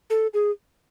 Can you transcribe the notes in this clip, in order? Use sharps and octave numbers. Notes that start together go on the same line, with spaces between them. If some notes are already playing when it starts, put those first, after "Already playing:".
A4
G#4